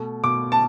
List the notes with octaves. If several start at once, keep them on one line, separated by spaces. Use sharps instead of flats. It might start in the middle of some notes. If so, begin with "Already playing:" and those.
Already playing: B2 A3
B2 D6
A5